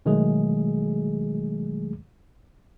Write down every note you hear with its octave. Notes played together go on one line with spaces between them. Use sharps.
B2 D#3 F#3 G#3 A3 G#4